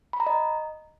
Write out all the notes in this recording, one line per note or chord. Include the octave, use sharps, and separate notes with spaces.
B5
A#5
D#5